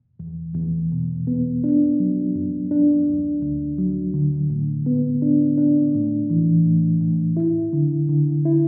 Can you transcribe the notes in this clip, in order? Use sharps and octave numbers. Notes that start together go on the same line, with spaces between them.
E2
E2
B2
B3
D4
F#3
F#2
D4
D2
D2
F#3
D3
A2
B3
D4
D4
A2
E3
A2
A2
E4
D3
D3
E4